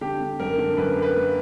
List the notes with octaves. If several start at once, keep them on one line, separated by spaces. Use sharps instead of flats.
D3 G4
D3
F#2 A#4
D3
F#2 B4
A#3
B4
A#3